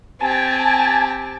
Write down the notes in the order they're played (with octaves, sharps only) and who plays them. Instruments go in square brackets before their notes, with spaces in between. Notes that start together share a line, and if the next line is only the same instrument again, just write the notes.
[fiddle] C4 G4 [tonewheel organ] G#5 A5